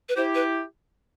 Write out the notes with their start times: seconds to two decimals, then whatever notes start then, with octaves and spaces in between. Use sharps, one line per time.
0.09 B4
0.16 E4 G4 C5
0.35 B4